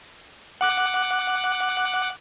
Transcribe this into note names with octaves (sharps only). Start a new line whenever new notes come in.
F#5 D6 F#6